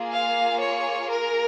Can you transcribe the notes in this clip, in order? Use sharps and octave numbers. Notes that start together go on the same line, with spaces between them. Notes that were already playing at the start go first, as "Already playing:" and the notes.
Already playing: A#3 F4 G#4
F5
C#5
A#4